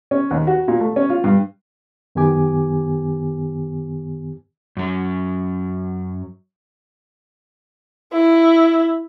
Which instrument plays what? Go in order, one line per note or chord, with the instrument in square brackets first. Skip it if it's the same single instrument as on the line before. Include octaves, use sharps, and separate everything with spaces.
[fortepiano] C#4
D#2
F#4
A#2
A3
C#4
F4
G2
[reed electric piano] F#2 D#3 B3 G4 G#5 D6
[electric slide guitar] F#2 F#3
[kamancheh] E4